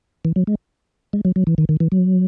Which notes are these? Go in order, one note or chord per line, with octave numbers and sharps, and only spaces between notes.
E3
F#3
G#3
G#3
F#3
F#3
E3
D#3
D#3
E3
F#3